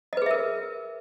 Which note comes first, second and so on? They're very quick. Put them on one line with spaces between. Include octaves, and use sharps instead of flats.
D#5 B4 G#4 E5 A#4